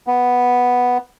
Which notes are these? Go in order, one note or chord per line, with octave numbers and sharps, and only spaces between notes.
B3